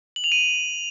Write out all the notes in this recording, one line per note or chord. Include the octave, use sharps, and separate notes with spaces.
F#7
F7
D#7